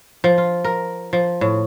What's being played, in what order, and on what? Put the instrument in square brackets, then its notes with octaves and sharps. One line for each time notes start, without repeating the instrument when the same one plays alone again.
[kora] F3
F4
A#4
F3
A2